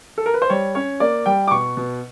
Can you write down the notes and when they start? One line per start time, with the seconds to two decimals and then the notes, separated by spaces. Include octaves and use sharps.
0.18 A4
0.26 A#4
0.34 B4
0.42 C5
0.50 G3 C#5
0.75 C#4 C#5
1.00 A#3 D5
1.26 G3 G5
1.47 D6
1.51 B2 C#6
1.77 B2